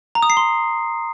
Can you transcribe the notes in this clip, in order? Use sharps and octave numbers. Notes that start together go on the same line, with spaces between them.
A#5
D#6
C7
C6